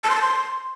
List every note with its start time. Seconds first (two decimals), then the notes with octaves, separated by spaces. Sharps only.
0.04 A5
0.10 C6
0.15 A5
0.21 C6